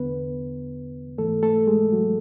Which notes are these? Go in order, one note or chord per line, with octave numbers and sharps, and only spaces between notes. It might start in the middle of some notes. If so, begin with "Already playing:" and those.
Already playing: E2 D3 B3 B4
G#2 E3 A3 A4
A3 A4
G#3 G#4
F#3 F#4